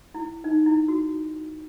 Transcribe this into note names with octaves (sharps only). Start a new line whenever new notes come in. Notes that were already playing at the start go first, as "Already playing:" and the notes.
E4
D#4
E4
F#4